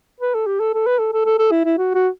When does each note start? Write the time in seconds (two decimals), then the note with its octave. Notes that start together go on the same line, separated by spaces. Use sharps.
0.20 B4
0.34 A4
0.47 G4
0.60 A4
0.74 A4
0.86 B4
0.99 A4
1.13 A4
1.25 A4
1.39 A4
1.51 E4
1.64 E4
1.78 F#4
1.94 F#4